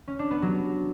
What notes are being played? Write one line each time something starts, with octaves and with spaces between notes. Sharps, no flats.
C#4
D4
B3
F#3